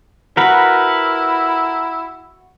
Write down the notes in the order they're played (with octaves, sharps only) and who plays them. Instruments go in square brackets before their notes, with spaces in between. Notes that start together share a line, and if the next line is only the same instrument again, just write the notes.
[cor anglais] E4 [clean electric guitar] F#4 [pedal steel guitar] A#4 B4